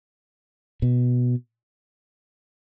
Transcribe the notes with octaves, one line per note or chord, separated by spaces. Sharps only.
B2